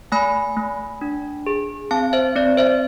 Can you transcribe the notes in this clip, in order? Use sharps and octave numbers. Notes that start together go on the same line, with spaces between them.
A3 G#5 B5
A3
D4
G#4
C4 F5 A5
C5 E5
C4 D5
C5 E5